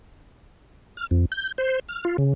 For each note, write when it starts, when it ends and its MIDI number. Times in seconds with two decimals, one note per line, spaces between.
0.97 1.07 89
1.11 1.25 41
1.32 1.52 91
1.58 1.79 72
1.89 2.04 89
2.05 2.17 65
2.18 2.34 49